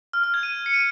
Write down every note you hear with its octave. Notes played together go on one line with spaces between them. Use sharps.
F6
F6
G#6
D#7
C#7
D#7